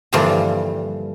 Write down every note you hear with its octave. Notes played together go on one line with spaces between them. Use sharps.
G2 A#2 D3 E3 F3 G3